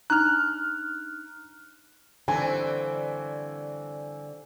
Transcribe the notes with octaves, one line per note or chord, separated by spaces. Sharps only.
D4 D#4 A#5 F6 F#6
G2 D3 E3 C4 G#5